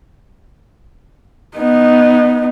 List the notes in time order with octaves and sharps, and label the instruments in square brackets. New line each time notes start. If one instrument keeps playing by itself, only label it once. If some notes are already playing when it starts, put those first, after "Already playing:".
[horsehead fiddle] B3 D#4